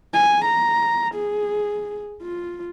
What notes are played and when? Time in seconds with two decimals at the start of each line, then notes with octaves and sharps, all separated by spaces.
0.14 G#5
0.45 A#5
1.15 G#4
2.22 F4